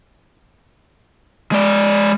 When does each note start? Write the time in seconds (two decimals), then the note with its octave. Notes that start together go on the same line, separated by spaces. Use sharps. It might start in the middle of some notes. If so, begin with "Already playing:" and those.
1.52 G#3 D5